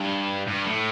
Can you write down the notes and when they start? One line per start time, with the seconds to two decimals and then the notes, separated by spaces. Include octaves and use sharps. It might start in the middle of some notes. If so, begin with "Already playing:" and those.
Already playing: G2
0.47 G2
0.65 A2